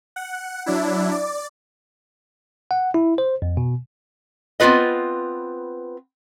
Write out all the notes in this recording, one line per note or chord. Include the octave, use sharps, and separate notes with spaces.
F#5
F#3 D4 E4
D5
F#5
E4
C5
F2
B2
B3 C4 E4 F4 B4 D#5